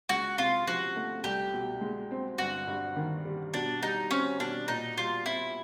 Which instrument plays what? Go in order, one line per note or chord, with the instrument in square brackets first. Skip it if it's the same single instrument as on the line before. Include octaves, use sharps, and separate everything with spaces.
[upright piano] C#2 [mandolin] F#4
[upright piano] C3 [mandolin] F4
[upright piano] F3 [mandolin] F#4
[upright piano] A3
[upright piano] C2 [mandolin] G4
[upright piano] B2
G#3
C4
[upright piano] G1 [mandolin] F#4
[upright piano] G2
D#3
G3
[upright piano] B2 [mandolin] D4
[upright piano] G3 [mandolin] D#4
[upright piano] C4 [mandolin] C#4
[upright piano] B2 [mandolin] D4
[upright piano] A#2 [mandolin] D#4
[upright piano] G3 [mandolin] F4
[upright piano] C4 [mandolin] E4